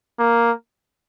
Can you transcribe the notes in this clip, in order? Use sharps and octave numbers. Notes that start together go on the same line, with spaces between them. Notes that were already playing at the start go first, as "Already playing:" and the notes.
A#3